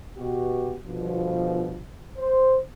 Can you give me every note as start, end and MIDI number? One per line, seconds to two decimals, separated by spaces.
0.18 0.75 47
0.18 0.75 66
0.18 0.75 67
0.84 1.81 31
0.84 1.81 47
0.84 1.81 53
2.18 2.58 72